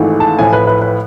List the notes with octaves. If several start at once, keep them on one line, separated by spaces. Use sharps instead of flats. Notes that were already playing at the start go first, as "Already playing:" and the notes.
Already playing: G#1 G#2 E3 A3
A5
A1 A2 F3 G#5
B4
B4
B4